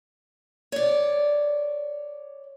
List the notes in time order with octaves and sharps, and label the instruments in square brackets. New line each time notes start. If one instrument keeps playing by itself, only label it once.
[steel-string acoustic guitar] C#5 D5